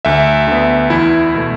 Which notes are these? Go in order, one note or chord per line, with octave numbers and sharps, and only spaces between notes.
D2 E5
D3 B3
E2 E4
B2 A3